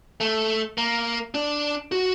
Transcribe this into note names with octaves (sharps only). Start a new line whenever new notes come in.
A3
A#3
D4
F#4